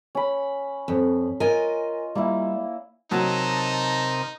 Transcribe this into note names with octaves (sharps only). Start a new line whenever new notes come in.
C#4 B5
F2
F4 A#4 D#5 G#5
G3 A#3 E4
C3 F#3 D#4 A#4 D#5 A5